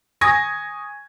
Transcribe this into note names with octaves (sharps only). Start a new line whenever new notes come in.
G#5 C#6 D#6 G#6 A#6